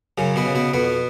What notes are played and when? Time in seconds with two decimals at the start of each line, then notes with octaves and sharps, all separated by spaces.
0.18 F#2 C#3 C#4
0.36 B2 B3
0.45 C#3
0.55 B2 B3
0.73 F2 B2 B3